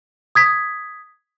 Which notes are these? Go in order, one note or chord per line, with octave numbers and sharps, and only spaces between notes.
D#6 G#6 B6